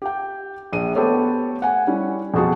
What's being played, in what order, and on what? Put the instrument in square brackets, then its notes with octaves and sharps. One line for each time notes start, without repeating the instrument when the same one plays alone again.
[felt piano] G4 G5
A#1 D#7
A3 B3 G4 A4 C5 C#5
F#5 G#5
G3 C#4 E4
F2 B2 F#4 G#4 A5